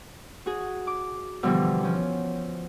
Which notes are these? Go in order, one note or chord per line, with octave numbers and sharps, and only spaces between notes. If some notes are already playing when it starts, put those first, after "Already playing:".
F#4 G#4
D6
B2 D3 E3 F3 G3
F3 C#4